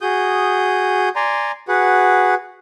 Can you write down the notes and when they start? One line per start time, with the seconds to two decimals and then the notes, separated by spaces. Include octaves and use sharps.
0.01 F#4 G#4 D#6 G6
1.16 D5 G#5 A#5 C6
1.68 F#4 G#4 B4 F#5